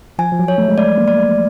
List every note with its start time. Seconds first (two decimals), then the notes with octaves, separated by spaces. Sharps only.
0.18 F3 G#5
0.32 F3
0.39 F#3
0.48 C#5
0.58 A3
0.68 G#3
0.78 A3 D5
0.98 A#3
1.08 D5
1.17 A3